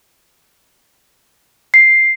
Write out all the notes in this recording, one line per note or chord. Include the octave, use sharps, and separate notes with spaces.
C7